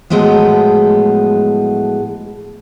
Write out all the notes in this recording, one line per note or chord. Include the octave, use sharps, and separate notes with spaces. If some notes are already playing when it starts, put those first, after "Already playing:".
A2 F3 F#3 G#3 A3 B3